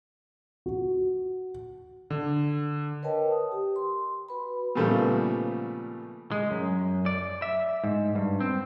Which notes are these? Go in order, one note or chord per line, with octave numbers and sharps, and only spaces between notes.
F#4
D3
A#4 B4 C#5 D#5 G5 A5
D#6
G4
C6
F#4 B4 B5
A#2 C#3 F3 G3 A3 B3
G#3
F#2
D5
E5
G#2
G2
C4